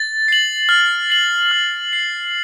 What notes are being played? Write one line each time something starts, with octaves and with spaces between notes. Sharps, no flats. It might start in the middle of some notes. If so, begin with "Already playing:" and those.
Already playing: A6
C7 F#7
F6
C7 F#7
F6
C7 F#7